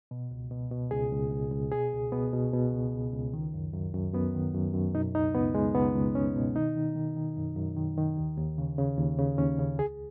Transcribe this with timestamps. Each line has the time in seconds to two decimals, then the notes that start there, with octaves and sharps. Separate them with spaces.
0.11 B2
0.31 C#2
0.51 B2
0.71 B2
0.91 C#2 G#4
1.12 C#2
1.31 C#2
1.51 C#2
1.71 B2 G#4
1.92 C#2
2.12 B2 B3
2.33 B2
2.53 B2
2.73 C#2
2.93 C#2
3.13 C#2
3.33 D#3
3.54 F#2
3.73 F#2
3.94 F#2
4.14 F#2 B3
4.35 D#3
4.54 F#2
4.74 F#2
4.94 B2 D#4
5.14 C#2 D#4
5.35 C#2 B3
5.55 C#2 G#3
5.75 C#2 B3
5.95 C#2
6.15 C#2 C#4
6.36 B2
6.56 D#3 D#4
6.76 D#3
6.96 D#3
7.17 D#3
7.37 F#2
7.56 F#2
7.76 D#3
7.97 D#3
8.17 D#2
8.38 D#2
8.58 C#3
8.78 C#3
8.98 D#2
9.18 C#3
9.38 D#2 C#4
9.59 C#3
9.78 C#2 G#4